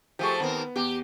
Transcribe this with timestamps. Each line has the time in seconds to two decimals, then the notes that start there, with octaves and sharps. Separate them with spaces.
0.19 F3 A3 G4 G#4 C#6
0.40 D#2 B3 C4 A#4
0.76 E2 G4